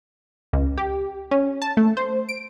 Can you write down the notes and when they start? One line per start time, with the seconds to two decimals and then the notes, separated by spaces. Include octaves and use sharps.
0.53 C#2
0.78 G4
1.31 C#4
1.62 A5
1.77 A3
1.97 C5
2.29 D7